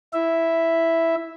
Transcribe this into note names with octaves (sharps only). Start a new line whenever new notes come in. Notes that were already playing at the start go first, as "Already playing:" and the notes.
E4 E5